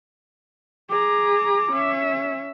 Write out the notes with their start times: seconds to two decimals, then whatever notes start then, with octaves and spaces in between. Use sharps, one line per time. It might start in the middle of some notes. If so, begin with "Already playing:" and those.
0.89 G#4 A#5 D6
1.72 C#4 E5